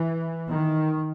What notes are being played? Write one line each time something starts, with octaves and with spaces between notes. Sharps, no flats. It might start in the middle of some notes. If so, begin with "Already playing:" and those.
Already playing: E3
D#3